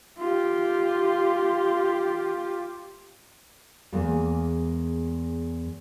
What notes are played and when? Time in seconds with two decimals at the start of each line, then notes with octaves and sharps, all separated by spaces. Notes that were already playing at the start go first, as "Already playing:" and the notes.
0.19 F4 G4
3.92 E2 G#3 A#3